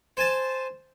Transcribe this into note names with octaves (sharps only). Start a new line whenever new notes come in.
C5 G#5 A5